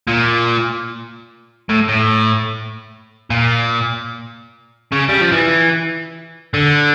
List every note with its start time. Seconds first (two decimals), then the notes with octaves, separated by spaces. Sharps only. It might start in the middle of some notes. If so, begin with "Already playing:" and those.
0.08 A#2
1.69 A2
1.88 A2
3.30 A#2
4.92 C#3
5.09 G3
5.21 F3
5.32 E3
6.54 D3